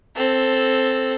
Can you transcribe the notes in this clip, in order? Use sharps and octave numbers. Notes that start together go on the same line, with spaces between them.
C4 A4